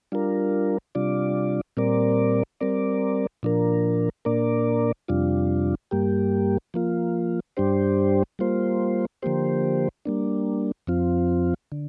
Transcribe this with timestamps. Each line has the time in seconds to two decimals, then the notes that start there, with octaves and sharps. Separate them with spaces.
0.12 G3 D4 F4 A#4
0.95 C3 G3 D4 F4 D5
1.77 A#2 G3 C4 A#4 D5
2.61 G3 C4 A#4 D5
3.43 A#2 F3 D4 A#4
4.25 A#2 A#3 D4 A#4 D5
5.08 F2 C3 G3 D4 F4
5.91 G2 G3 A#3 G4
6.74 F3 A#3 F4
7.57 G2 G3 D4 G4 C5
8.39 G3 A#3 F4 C5
9.22 D3 F3 A#3 G4 C5
10.05 G3 A#3 D4
10.87 F2 F3 C4 F4
11.72 D3